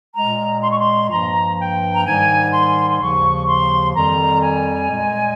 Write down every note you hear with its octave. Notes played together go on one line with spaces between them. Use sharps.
A#2 G#3 A#5
C6
C#6
C6
G2 F3 A#3 A#5
G5
A#5
G#2 D#3 G3 G#5
C6
C6
D#2 C#3 F3 C#6
C6
F2 D#3 G3 A#5
G#5
A#2 G#3